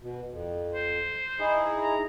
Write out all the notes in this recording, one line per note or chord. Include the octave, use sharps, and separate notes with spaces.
B2
F2
C5
D#4 E4 G#4
A#5